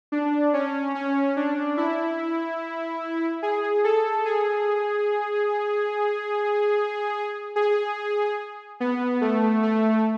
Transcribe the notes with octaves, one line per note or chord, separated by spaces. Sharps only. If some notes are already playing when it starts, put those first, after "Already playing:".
D4
C#4
C#4
D4
E4
G#4
A4
G#4
G#4
B3
A3
A3